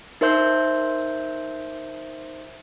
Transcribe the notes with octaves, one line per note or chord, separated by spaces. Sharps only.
D#4 A#4 C5 E5 C6 G6